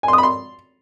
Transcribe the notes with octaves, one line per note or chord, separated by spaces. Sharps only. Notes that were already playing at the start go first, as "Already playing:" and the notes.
G#5
C6
D#6
B5
C6